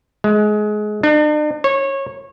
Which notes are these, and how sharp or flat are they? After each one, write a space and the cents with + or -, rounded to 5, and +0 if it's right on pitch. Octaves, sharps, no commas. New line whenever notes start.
G#3 +25
D4 +45
C#5 -20